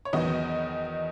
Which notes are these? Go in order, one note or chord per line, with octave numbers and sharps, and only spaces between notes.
C#5
E2 D#3 F#3 B3 D#5